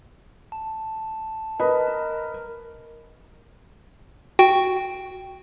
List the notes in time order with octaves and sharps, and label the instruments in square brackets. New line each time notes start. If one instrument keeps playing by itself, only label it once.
[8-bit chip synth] A5
[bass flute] A#4 [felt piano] B4 D#5
[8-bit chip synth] F#4 G5